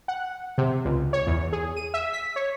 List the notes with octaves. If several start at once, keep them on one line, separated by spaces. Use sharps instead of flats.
F#5
C3
C#2
C#5
E2
G#4
D#7
E5
B6
C#5